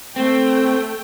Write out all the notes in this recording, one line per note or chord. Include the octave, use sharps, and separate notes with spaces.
A3 C4 G5